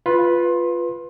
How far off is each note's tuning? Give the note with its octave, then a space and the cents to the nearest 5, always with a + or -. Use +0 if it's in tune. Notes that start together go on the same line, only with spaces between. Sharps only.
F4 +0 B4 +0 C6 +25